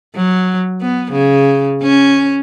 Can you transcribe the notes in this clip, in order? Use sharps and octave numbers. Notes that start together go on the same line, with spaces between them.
F#3
B3
C#3
C#4